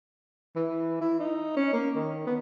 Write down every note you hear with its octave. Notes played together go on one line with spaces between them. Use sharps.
E3
E4
D#4
C#4
A#3
D#3
B3